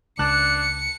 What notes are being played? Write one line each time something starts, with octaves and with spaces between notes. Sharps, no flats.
C#2 D4 A5 F#6 C#7